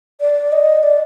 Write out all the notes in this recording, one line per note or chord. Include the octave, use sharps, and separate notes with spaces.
D5
D#5
D5